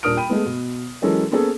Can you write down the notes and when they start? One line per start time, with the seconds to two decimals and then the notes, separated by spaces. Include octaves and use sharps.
0.03 D#1 D4 A#4 D#6 F6 D7
0.17 G5 B5 D#7
0.29 G#3 A3 B3
0.46 B2
1.02 E3 F#3 G#3 C#4 A4 A#4
1.31 A#3 B3 C#4 G#4 A4